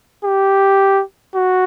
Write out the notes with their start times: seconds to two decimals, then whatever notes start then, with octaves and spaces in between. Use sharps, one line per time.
0.24 G4
1.35 F#4